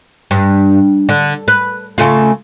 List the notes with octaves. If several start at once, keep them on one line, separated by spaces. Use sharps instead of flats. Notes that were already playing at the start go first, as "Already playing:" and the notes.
G2
D3
B4
C#3 A3 F4